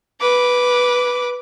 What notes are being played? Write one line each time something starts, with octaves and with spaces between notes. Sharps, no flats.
B4 D6